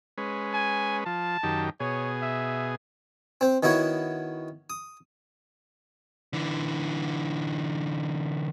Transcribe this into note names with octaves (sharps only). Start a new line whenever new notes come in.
G#3 C#4 B4
G#5
F3 A5
F#2 D#3 G4
B2 G#4 C#5
E5
C4 C5
D#3 B3 E4 F#4 C#5
D#6
D3 E3